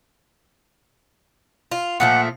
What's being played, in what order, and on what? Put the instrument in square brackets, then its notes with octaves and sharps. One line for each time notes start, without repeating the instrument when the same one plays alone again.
[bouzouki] F4
[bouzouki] A#2 F3 A3 [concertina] F#5